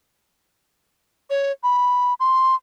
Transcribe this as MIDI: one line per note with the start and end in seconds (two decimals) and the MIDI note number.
1.30 1.52 73
1.63 2.14 83
2.20 2.55 84